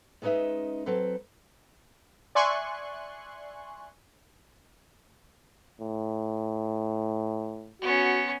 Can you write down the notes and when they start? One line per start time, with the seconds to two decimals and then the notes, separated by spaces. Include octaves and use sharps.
0.22 G#3 C#4 D#4 B4 D#5 E5
0.86 F#3 C4 A4 B4
2.35 D5 E5 G#5 C6 C#6 F#6
5.81 A2
7.81 B3 C#4 F#4